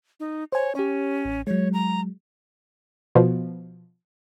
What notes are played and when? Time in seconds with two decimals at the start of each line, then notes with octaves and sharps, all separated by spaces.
0.20 D#4
0.52 C5 C#5 G#5
0.75 C#4 G4 C#5
1.25 A1
1.47 F#3 G#3 C#5
1.73 A#5
3.15 B2 F3